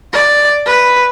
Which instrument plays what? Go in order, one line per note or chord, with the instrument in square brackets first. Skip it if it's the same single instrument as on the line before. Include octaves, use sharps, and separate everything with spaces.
[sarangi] D5
B4